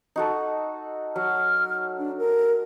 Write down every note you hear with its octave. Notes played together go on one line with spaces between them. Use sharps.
D#4 F#4 A4
F#3 F6
D4
A#4